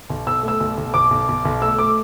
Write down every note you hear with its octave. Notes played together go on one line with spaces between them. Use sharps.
B1
B1 E6
A3 E6
B1
B1
B1 D6
B1
B1
B1
A3 E6
A3 D6